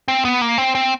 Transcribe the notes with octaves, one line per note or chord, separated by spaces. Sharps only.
C4
B3
A#3
C4
C4